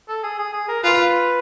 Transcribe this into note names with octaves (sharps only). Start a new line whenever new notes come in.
A4
G#4
G#4
G#4
A#4
F4 B4